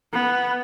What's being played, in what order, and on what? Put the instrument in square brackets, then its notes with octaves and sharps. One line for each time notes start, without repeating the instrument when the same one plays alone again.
[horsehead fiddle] B3